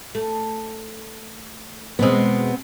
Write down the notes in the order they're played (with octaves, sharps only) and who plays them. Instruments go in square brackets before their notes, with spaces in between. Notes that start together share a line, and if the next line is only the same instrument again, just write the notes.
[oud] A3
[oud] E2 B2 G#3 [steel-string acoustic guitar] B3 C4